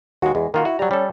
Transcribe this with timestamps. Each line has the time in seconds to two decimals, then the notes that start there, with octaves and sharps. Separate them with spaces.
0.22 D#2 G#3 F#4
0.35 E2 G#3
0.54 D#3 A#3 F4 F#4
0.65 E4 F#4
0.79 F#3 G3 A#5
0.91 G3 C#4 A4